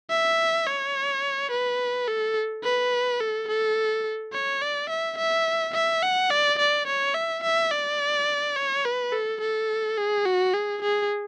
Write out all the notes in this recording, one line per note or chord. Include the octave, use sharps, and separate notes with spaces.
E5
C#5
B4
A4
B4
A4
A4
C#5
D5
E5
E5
E5
F#5
D5
D5
C#5
E5
E5
D5
C#5
B4
A4
A4
G#4
F#4
G#4
G#4